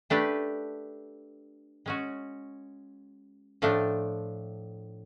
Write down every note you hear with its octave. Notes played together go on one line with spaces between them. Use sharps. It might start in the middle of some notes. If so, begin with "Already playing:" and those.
A3 D4 G4 B4
G#3 C#4 F#4
A2 F3 A3 D4